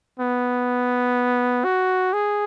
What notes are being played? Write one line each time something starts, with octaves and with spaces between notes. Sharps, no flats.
B3
F#4
G#4